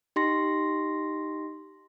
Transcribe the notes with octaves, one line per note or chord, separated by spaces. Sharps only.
D#4 G4 C6 A#6